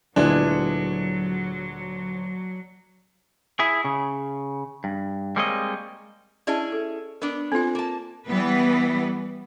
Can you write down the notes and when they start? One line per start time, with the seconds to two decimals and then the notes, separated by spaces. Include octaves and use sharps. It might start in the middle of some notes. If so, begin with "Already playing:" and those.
0.16 D2 A#2 F#3 G#3 B3 D4 E4
3.59 E4 G#4
3.85 C#3
4.84 G2
5.36 G3 G#3 A#3 C4 C#5 D#5
6.47 C#4 E4 G#4 D5 D#5 A5
6.72 A4
7.22 B3 D4 A#4
7.52 C4 F4 A4 C5 G#5
7.75 A#3 A5
8.27 E3 G3 B3 B4